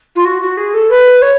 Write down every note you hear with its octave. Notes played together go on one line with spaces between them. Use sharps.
F4
F#4
F#4
G#4
A4
B4
C#5